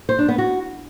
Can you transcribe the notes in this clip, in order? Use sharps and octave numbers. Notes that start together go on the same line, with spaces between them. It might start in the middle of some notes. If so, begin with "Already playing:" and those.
C5
D4
B3
F#4